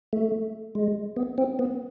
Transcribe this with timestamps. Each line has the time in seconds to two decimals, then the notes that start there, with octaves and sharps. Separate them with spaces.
0.13 A3
0.75 G#3
1.16 B3
1.38 C4
1.59 B3